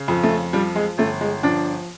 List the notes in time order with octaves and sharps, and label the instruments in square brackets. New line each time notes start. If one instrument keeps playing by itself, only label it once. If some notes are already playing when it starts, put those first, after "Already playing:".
Already playing: [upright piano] C#3
F2
A3
F3 G3
G#3
G1 A3
G#3
F3 D4